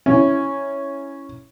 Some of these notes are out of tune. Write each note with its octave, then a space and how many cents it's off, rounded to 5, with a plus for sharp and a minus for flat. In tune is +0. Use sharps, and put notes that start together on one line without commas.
C#4 +0 E4 +0